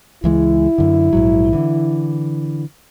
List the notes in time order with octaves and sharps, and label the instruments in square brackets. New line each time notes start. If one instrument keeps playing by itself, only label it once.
[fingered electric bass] C#2 E3 G#3 [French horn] E4
[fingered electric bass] F#2 D3
A#1 G#2 F#3
D3 E3